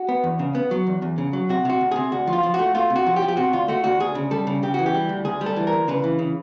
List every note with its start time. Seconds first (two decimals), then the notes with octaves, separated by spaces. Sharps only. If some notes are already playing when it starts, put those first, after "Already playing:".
Already playing: F#4
0.09 B3
0.24 E2
0.39 C#3
0.55 B3
0.71 F#3
0.87 E2
1.02 E2
1.18 C#3
1.33 F#3
1.49 C3 F#4
1.65 C3 F#4
1.81 D2
1.91 C3 G#4
2.12 D2 F#4
2.27 F3
2.33 F4
2.43 F3
2.54 F#4
2.59 A3
2.75 A3 F4
2.90 C3
2.96 F#4
3.06 F3
3.16 G4
3.22 F3
3.28 G4
3.37 C3 F#4
3.53 D2 F4
3.68 A3 F#4
3.84 D2 F#4
4.00 D2 G#4
4.15 C#3
4.31 G3 A4
4.47 C#3
4.63 C#3 G4
4.74 E3 F#4
4.86 G4
4.94 G3
5.09 D2
5.25 D2 G#4
5.41 G3
5.46 A4
5.56 E3
5.67 A#4
5.73 D2
5.88 C#3 B4
6.04 E3
6.19 C#3